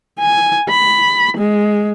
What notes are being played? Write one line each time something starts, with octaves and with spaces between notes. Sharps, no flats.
G#5
B5
G#3